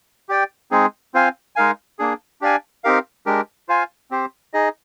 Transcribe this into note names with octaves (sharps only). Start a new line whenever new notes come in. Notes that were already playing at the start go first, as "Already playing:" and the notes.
G4 D5 G5
G#3 C4 D#4 G#4
C4 F4 C5 F5 G#5
G#3 D#4 A#4 F5 G#5
A#3 D4 G#4
D4 G4 D5 F5 G#5
C4 D#4 G4 A#4 F5
G#3 D4 G4 A#4
F4 C5 F5 G#5
C4 G4 C5
D#4 G#4 D#5